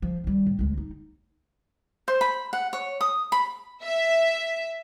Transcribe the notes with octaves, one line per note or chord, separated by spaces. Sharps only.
F3
D#3 G3
A2
D2 G#3
D#4
C5
B5
F#5
C#5
D#6
B5
E5